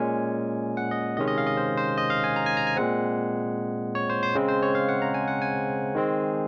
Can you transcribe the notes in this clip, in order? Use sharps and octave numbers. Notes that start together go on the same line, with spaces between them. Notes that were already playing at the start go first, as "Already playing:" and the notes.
Already playing: A#2 G#3 C#4 G#5
F#5
D#5
C3 D#3 G#3 C#4 D#5
D#5
F5
D#5
C5
C5
D#5
F5
G#5
A#5
G#5
A#5
G#5
A#2 G#3 C4 F#5
C#5
C5
C5
C#3 G#3 C4
C5
C#5
F5
F#5
A#5
G#5
F#5
G#5
D#3 G#3 C4